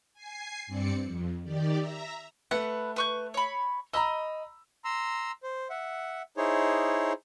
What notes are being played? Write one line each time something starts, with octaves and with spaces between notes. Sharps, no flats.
G#5 C7
G2 C4 D5 C#7
F2
D#3 G4 D5
E5 A#5
A3 B4 F#5
B4 C#6 G6
C#5 B5
D#5 A#5 B5 E6
A#5 C6 E6
C5
E5 F#5
D#4 E4 G#4 C5 C#5